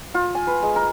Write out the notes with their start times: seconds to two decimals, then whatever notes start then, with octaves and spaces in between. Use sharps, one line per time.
0.14 F4
0.35 G#5
0.47 B4
0.62 G#3
0.76 A#4